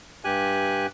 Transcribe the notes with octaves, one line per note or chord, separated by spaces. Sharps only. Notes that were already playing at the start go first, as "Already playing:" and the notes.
G2 G4 G#5 F#6